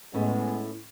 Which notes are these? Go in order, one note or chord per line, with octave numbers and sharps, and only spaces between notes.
A2 G#3 B3 C#4